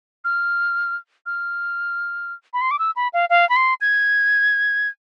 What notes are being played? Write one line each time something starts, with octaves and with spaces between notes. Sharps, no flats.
F6
F6
B5
C6
D6
E6
B5
F5
F5
B5
C6
G#6